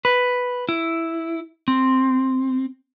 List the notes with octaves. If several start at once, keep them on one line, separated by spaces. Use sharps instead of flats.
B4
E4
C4